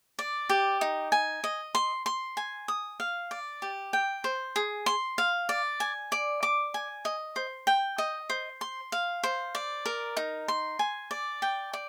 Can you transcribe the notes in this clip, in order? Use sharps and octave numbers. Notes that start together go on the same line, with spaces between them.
D5
G4
D#4
G#5
D#5
C6
C6
G#5
D#6
F5
D5
G4
G5
C5
G#4
C6
F5
D5
G#5
D5
D6
G#5
D#5
C5
G5
D#5
C5
C6
F5
C5
D5
A#4
D#4
C6
G#5
D5
G5
D5